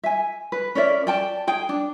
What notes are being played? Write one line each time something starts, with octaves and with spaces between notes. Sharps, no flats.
E5 G#5
B4
C#4 A#4 D5 E5
D5 G5 A5
G#4 G5
D4